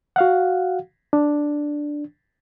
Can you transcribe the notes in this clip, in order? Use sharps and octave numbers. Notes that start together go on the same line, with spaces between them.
F#4 F5 F#5
D4